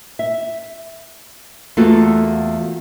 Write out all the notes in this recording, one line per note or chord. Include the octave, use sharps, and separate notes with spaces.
E5
E2 A3 A#3 F4 F#4 A4